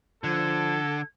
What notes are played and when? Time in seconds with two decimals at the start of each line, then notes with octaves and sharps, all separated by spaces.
0.24 D3 F3 A4 G#6